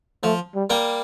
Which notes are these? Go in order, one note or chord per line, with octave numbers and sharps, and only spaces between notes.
F3 A3
G3
G3 A#3